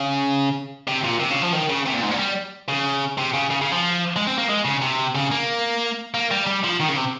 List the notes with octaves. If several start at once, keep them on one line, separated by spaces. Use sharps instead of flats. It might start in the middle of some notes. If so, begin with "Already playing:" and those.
Already playing: C#3
C3
A#2
C3
C#3
F3
D#3
C#3
C3
A#2
G#2
A#2
G3
C#3
C3
C#3
C#3
C#3
F3
G#3
C4
A#3
G#3
C#3
C3
C#3
A#3
A#3
G3
G3
F3
D#3
C#3
C3